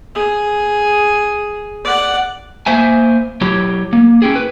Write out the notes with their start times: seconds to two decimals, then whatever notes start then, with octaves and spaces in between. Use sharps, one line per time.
0.15 G#4
1.84 D5 F#5
2.66 A#3 C5 E5 G#5
3.41 F#3 E4 G4 C#5
3.93 A#3
4.22 C#4 E4 G4 G#4
4.35 B4